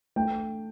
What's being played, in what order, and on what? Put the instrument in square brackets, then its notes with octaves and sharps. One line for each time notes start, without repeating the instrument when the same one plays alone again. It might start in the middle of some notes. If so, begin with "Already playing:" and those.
[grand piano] A3 G5